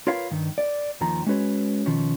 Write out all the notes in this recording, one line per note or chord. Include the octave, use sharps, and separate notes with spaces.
F4 A#4 B4 C#5 F5
G2 D#3
D5
D#2 D#3 F3 A#5
G#3 C#4 F#4 B4 C#5
B2 D#3 F3 C#4